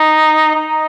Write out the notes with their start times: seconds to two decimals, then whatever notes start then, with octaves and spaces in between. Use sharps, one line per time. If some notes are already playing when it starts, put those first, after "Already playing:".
Already playing: D#4
0.55 D#4